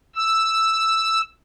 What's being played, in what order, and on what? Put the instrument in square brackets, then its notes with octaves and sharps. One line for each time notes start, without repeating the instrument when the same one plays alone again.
[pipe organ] E6